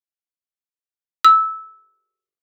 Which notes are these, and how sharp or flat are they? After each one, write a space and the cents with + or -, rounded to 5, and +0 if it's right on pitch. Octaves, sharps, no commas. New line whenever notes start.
E6 -15